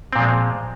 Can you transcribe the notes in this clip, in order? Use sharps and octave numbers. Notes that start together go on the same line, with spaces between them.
A#2 F3 G#3 C4